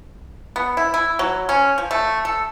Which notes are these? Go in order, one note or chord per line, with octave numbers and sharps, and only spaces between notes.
B3
E4
E4
F#3
C#4
F3
A3
A4